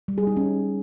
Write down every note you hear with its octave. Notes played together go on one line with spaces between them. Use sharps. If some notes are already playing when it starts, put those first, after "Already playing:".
G3
G#4
D#4
C#4